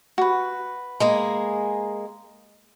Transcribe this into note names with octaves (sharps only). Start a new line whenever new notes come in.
F#4 B4
G#3 A#3 G#4